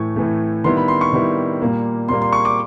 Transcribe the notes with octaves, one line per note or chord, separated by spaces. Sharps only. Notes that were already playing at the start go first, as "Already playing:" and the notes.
Already playing: A2 E3 A3 C#6
A2 E3 A3
D#3 G3 B3 E4 C6
B5
C6
C#6
D#3 G3 B3 E4
A#2 G3 A#3
A#2 G3 A#3 C6
C6
C#6
D6